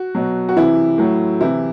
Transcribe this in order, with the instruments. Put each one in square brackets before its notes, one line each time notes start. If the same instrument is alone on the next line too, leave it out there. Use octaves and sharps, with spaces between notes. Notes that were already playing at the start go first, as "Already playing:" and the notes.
Already playing: [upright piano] F#4
B2 F#3
F#4
C3 E3 E4
A2 F#3
C3 E3 E4